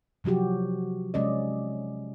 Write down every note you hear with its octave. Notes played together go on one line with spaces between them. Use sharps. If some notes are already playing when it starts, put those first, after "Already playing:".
C3 F3 F#3 F#4 G4
C3 G#3 C#4 D5 D#5